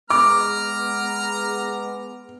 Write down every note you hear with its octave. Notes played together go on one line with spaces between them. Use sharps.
G#3 B3 A#5 D6 F6